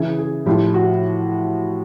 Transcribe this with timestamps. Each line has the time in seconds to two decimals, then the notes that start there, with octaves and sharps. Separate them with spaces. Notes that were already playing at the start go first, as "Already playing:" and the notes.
Already playing: C#3 E3 G#4
0.18 G#4
0.46 A2 F3 G4
0.74 F#4